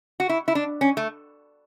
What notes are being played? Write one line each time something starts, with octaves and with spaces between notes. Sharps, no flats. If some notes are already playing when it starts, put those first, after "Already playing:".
F#4
E4
E4
D4
C#4
A3